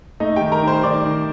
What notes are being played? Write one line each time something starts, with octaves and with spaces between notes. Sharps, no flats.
A3 D#4 D#5
D#3 G4 G5
A#4 A#5
D#3
C5 C6
D#3 D5 D6
D#3